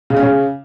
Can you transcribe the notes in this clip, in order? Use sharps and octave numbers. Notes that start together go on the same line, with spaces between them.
C#3
C#4
C#3